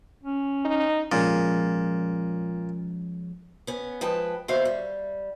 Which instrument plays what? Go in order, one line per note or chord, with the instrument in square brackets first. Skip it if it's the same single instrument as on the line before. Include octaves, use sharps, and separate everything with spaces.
[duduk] C#4
[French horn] D#4
[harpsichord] A#2 [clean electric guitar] F3 G#3 C#4
[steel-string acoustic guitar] B3 C#4
F3 G#3 B4 G5 A5
D#2 B2 F#4 C5 E5 F5
G3